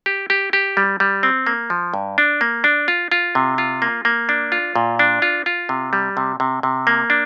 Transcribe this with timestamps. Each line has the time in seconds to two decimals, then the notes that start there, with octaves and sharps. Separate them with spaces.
0.06 G4
0.30 G4
0.53 G4
0.77 G3
1.00 G3
1.23 C4
1.47 A#3
1.70 F3
1.94 G2
2.18 D4
2.41 A#3
2.64 D4
2.88 F4
3.12 F4
3.35 C3
3.58 F4
3.82 A#3
4.05 A#3
4.29 D4
4.52 F4
4.76 A#2
4.99 D4
5.22 F4
5.46 F4
5.69 C3
5.93 G3
6.17 C3
6.40 C3
6.63 C3
6.87 A#3
7.10 D4